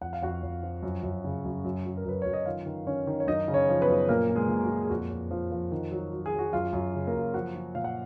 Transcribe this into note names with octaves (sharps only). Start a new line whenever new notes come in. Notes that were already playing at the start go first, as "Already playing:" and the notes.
F2 F#5
F5
F2 F#4 F#5
F2
F3
F#2
F#2
C#3
F#2
F#2
F#3
A#4
F#2 B4
F#2 C#5
D#5
D#3 F4 F5
D#3
D#3 C#4 C#5
D#3
C#5
F#2 D#4 D#5
C#3
C#4 C#5
F3
B3 B4
F#2
A#2 A#3 A#4
A#2
G#3 G#4
A#2
F#4
A#2
G#4
F2 F#4
F2
F3
F3
D#3
F#3
F#3
G#4
F#3
F#4
F#2 F4
F#2
C#3
A#3 A#4
F#2
F3 F#4 F#5
F3
A#2 F5
F#5